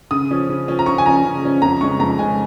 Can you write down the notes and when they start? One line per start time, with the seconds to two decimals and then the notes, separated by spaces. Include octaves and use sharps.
0.11 C#3 D#6
0.31 F3 C#4
0.49 C#3
0.68 F3 C#4
0.79 A#5
0.86 C#3 C#6
0.98 G#5
1.05 F3 C#4 A#5
1.24 C#3
1.43 F3 C#4
1.62 F2 A#5
1.81 C#3 G#3 C#4 C#6
1.99 F2 A#5
2.19 C#3 G#3 C#4 G#5